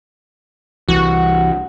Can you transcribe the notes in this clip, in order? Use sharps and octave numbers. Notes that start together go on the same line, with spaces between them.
C2 E3 F#4